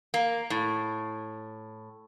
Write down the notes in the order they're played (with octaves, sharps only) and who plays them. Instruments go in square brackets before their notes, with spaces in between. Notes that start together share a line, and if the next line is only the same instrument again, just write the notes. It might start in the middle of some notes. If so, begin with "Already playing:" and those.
[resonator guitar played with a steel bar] A#3
A2